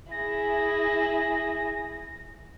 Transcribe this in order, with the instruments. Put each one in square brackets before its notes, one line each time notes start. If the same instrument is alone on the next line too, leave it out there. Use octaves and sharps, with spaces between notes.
[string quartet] E4 G#4 [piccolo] A#6